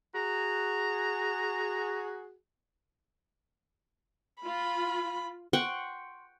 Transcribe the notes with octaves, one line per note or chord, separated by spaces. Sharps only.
F#4 G#4 A#5
F4 B5
F#5 G5 C6 C#6